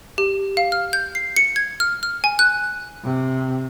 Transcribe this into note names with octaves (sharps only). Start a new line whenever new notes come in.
G4
F5
F6
G6
C7
C#7
G#6
F6
F6
G#5
F#6
C3